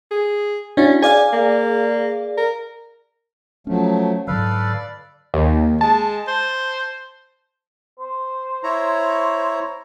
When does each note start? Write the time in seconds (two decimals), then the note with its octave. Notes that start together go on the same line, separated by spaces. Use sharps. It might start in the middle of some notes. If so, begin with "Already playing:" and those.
0.11 G#4
0.77 C#4 D4 E4 F#4
1.02 G#4 D5 F5 G#5
1.33 A#3
2.37 A#4
3.67 F3 F#3 A3 C#4
4.27 G#2 D3 F#3 A4 B4 D5 F5
5.34 D#2
5.81 G#3 A5
6.27 C5
7.99 C5
8.64 E4 C#5 A#5